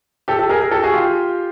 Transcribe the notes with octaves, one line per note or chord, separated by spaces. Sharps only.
G4 A4
G4 A4
G#4 A#4
G#4 A#4
G4 A4
F#4 G#4
F4 G4